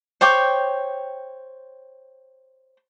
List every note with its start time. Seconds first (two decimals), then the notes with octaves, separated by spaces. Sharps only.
0.21 C5 C#5 G5 D6